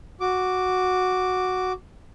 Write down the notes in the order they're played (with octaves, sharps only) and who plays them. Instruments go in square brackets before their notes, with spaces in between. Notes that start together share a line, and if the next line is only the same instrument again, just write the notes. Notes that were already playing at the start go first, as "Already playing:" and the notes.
[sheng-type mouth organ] F#4 D6